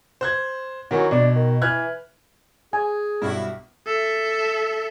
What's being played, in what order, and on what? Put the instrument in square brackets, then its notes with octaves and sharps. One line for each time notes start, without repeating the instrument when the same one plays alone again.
[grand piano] C5 F#6 G#6
[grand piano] D#3 E3 [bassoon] F#3
[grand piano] B2 [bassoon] D4
[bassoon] D#3
[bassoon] E3 [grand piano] F6 F#6 G#6
[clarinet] G#4 [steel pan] G#5
[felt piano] B1 G2 [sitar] E4 F#4
[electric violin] A4 E5